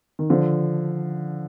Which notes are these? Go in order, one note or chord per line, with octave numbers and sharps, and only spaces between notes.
D#3
D3 F3